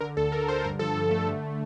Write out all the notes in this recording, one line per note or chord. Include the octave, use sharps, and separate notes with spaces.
D3 A#4
D2 A4
D2 A#4
D3 C5
G2 A#4
F3 A4
G2
A3
D3